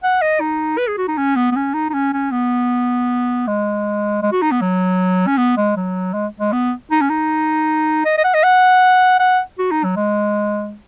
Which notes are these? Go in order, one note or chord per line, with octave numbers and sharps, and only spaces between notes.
F#5
D#5
D#4
B4
G#4
F#4
D#4
C#4
B3
B3
C#4
D#4
D#4
C#4
C#4
B3
G#3
G#3
F#4
D#4
B3
F#3
C#4
B3
G#3
F#3
G#3
G#3
B3
D#4
C#4
D#4
D#5
D#5
F#5
D#5
F#5
F#5
F#4
D#4
F#3
G#3